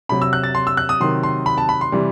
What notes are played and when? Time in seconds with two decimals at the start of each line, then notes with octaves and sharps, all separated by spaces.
0.09 C3 F#3 B5
0.22 E6
0.33 F#6
0.44 A6
0.55 C6
0.67 E6
0.77 F#6
0.89 D#6
1.00 C3 D#3 F#3 C6
1.23 C6
1.46 B5
1.58 A5
1.69 B5
1.81 C6
1.92 C3 E3 G3